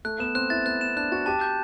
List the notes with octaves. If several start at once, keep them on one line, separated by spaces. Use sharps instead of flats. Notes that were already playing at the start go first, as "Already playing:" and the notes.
A3 F#6
B3 E7
C4 F#6
E4 A6
B3 F#6
C4 E7
D4 F#6
F#4 A6
G4 A5
G6